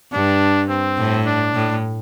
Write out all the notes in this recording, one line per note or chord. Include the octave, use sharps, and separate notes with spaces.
G2 D4
C4
A2
D4
A2